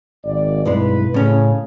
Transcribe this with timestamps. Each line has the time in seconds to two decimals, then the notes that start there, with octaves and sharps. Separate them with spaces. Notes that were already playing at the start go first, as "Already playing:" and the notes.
0.25 G#1 D5
0.65 B1 G2 G#3 C4 E4 B4
1.14 A2 C#3 C#4